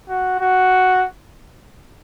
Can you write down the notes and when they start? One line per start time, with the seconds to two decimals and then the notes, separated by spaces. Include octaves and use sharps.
0.09 F#4
0.40 F#4